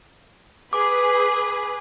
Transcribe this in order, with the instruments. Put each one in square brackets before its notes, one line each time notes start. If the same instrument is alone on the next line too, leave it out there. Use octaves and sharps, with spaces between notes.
[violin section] G#4 B4 [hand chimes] D6